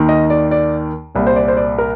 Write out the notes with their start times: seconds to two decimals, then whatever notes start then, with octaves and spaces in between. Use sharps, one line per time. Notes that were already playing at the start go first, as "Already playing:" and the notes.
Already playing: D#2 D#3
0.09 D#5
0.30 D5
0.51 D5
1.15 C2 A#2
1.27 C5
1.36 D5
1.48 C5
1.57 D5
1.78 A#4